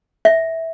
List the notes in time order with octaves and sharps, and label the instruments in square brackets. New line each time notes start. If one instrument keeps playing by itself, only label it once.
[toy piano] E5